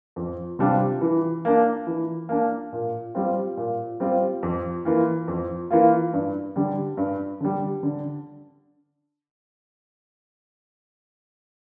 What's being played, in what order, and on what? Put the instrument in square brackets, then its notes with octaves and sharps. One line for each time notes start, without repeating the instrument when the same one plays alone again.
[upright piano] F2
C3 G3 D4 F4
E3
A#3 D4
E3
A#3 D4
A#2
G3 C4 F4
A#2
G3 C4 F4
F2
E3 A#3 F4
F2
E3 A#3 F4
G2
D3 G3
G2
D3 G3
D3